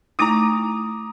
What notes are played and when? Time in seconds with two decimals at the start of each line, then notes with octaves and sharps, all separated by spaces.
0.19 A3 D#4 E4 A#5 D6 D#6